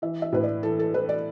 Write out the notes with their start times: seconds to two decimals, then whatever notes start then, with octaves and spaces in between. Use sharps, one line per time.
0.02 E3 E5
0.22 E5
0.32 A2 B4
0.43 D5
0.63 E3 A4
0.79 A4
0.94 E3 B4
1.09 D5